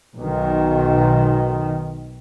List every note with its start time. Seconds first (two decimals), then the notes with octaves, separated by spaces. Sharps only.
0.15 B1 D#3